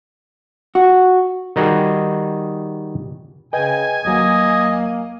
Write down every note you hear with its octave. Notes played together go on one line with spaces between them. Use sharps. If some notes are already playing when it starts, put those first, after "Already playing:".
F#4
D#3 G3 D#4 F#4 G#4
C#3 B4 D#5 G5 G#5
D#2 F#3 A#3 D#5